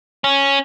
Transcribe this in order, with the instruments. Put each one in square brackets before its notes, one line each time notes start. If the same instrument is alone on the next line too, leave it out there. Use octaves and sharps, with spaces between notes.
[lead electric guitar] C#4